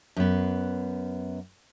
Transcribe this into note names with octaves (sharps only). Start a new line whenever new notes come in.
F#2 B3